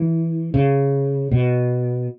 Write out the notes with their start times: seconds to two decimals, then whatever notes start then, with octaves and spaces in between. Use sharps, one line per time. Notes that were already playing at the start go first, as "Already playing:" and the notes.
Already playing: E3
0.54 C#3
1.31 B2